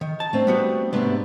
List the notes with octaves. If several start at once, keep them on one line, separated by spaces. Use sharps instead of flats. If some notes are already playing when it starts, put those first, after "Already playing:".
D#3
A5
A3 C4 D4
G3 B3 F#4
G#2 C3 A3 B3 D4